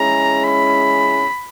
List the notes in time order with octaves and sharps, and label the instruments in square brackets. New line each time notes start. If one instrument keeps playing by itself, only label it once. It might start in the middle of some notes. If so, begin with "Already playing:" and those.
Already playing: [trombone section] G#3 C#4 E4 G#4 [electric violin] A#5
[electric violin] B5